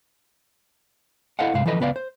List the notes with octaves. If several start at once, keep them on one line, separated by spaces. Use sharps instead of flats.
E4 A4 C5 D#5 F5 F#5
G2 C3 G#3 F5
E3 F3 A4 B4 D#5
C#2 B3 B4 D5 F5
C5